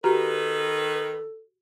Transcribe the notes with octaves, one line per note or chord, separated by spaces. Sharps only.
D#3 F#4 G4 A4 B4 A#5